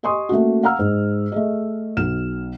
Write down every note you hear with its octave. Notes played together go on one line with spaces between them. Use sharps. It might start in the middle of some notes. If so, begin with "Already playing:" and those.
G4 D#5 G#5 C6 C#6 D#6
A3 A#3 C#4 F#4
F5 F#5 A#5 E6 F6
G#2
A3 G#4 D#5
B1 B2 F6 E7